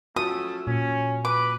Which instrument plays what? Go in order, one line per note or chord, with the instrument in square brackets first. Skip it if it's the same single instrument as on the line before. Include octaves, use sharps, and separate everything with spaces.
[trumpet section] A3 C#4 A4 [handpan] F4 F#4 [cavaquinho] D#6
[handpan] A#2 [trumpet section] C#4
[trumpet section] B4 [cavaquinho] D6